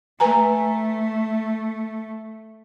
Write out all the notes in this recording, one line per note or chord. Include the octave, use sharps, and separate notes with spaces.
A3 B4 G#5 A#5